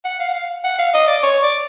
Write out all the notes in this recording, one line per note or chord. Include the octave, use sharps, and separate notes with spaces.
F#5
F5
F#5
F5
F#5
F5
D#5
D5
C#5
D5